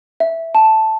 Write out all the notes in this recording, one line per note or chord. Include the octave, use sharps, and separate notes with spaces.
E5
A5